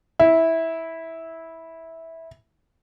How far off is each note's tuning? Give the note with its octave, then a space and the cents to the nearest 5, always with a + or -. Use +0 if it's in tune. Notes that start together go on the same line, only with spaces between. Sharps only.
E4 -15